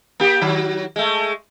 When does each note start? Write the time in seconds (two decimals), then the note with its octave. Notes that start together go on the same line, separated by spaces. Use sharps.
0.20 A#3 G4
0.41 D#3 F#3
0.96 G#3 A3